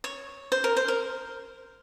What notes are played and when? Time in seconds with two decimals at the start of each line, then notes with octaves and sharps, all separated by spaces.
0.04 C#5
0.52 C5
0.64 A#4
0.77 C5
0.88 A#4